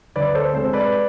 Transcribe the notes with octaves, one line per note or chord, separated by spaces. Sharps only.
D2 B4 D5
A4 C5
C3 G#3 A4 C5
B4 D5